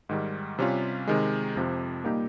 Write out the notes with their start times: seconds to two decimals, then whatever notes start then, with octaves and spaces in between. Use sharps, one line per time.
0.09 G#2 D#3 G3
0.59 C3 G3 C#4 F4
1.07 C3 D#3 G#3
1.56 F2 C3 F3
2.04 A#2 G3 A#3 D#4 G4